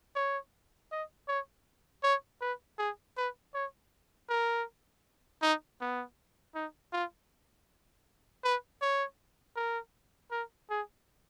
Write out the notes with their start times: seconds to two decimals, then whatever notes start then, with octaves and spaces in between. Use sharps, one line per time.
0.15 C#5
0.92 D#5
1.28 C#5
2.03 C#5
2.41 B4
2.79 G#4
3.17 B4
3.54 C#5
4.29 A#4
5.42 D#4
5.81 B3
6.55 D#4
6.93 F4
8.44 B4
8.82 C#5
9.56 A#4
10.31 A#4
10.70 G#4